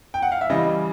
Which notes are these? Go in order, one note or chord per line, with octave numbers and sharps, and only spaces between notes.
G5
F#5
F5
E5
C#3 E3 G3 D#5